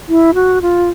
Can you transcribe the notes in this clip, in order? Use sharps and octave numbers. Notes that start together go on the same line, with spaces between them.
E4
F#4
F4